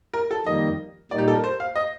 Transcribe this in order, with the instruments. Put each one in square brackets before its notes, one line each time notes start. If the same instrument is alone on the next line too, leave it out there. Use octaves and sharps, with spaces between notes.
[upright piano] A#4
A4
[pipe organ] F2 D#3 G3 A#3 [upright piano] D#5
[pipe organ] A#2 G3 A#3 D#4 [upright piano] D5
[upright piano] G4
A4
A#4
C5
F5
D#5